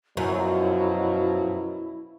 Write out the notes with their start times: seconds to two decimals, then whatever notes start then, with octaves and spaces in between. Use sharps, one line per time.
0.17 F#2 B2 F3 F#3 E4